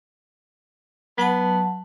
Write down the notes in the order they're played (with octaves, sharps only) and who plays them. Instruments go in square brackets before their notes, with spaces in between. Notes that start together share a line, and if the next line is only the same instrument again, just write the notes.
[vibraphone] F#3 F#5 A5 [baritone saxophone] B3